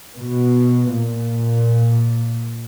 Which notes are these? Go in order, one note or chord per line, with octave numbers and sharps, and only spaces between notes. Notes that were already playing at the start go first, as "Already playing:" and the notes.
B2
A#2